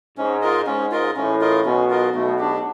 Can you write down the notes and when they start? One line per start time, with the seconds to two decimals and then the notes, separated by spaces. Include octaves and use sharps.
0.18 G#2 C#4
0.42 F4 A#4 D#5
0.66 G#2 C#4
0.92 F4 A#4 D#5
1.16 A1 A2 C#4
1.41 F4 A#4 D#5
1.65 B1 B2 C#4
1.90 F4 A#4 D#5
2.14 B1 B2 A3
2.38 D4 G4